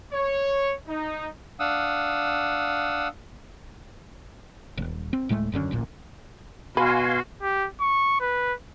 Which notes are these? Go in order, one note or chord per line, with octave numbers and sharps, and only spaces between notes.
C#5
D#4
D4 F5 F#5 D#6 E6
D#1
C4
D1 A2 G#3 A3
D#1 F#2 D3 C#4
D1 A1 A#2
B2 F#4 B4 F5 G#5 C6
G4
C#6
B4